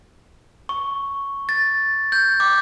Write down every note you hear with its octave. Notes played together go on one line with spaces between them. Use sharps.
C#6
A6
G6
D6